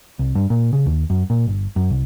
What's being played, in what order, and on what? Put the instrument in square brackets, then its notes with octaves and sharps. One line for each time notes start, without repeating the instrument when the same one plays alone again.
[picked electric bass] C2
G2
A#2
C#3
D#2
F#2
A#2
G1
F#2
C2